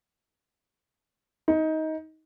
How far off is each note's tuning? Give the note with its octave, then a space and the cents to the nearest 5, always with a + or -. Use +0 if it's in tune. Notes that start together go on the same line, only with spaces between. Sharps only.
D#4 +20